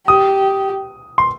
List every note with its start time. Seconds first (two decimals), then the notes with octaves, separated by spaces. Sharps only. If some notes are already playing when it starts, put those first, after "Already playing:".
0.08 G4 D#6
1.18 C6